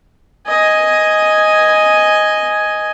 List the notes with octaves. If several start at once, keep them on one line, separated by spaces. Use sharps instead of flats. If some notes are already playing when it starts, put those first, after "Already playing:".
D#5 G#5